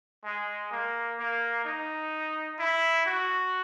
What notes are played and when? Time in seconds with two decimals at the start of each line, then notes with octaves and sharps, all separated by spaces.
0.24 G#3
0.71 A#3
1.19 A#3
1.65 D#4
2.59 E4
3.06 F#4